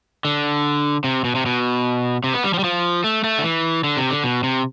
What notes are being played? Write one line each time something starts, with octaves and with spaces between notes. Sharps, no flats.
D3
C3
B2
C3
B2
C3
B3
G3
F3
G3
F3
A3
A3
D3
E3
D3
C3
D3
B2
C3